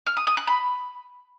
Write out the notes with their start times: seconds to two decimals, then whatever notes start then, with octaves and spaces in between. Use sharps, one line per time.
0.07 F6
0.17 D#6
0.27 D#6
0.37 F#6
0.47 B5